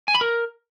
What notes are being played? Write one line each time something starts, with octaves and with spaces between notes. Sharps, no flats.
G#5
B5
A#4